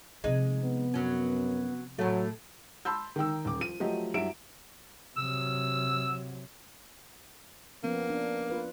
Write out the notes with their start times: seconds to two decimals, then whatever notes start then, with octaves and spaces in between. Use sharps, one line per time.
0.24 C3 F3 G#3 D#4
0.63 B3
0.94 F#2 F#3 C#4
1.99 A2 F#3 A3
2.85 A5 B5 C6 E6 G6
3.16 D#3 D#4 G5 E6
3.45 D#1 D6
3.60 F3 D#7
3.80 F3 F#3 A3 G4 D#5
4.14 G2 F#3 E4 E5 D7 E7
5.17 C3 F#3 E6
7.84 F3 A#3 B3 C#4
8.10 D4
8.50 F4 B4